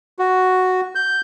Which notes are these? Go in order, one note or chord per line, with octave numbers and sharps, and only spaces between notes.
F#4
G6